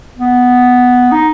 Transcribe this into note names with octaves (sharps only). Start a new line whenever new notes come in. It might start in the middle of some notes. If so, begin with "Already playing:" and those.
B3
D#4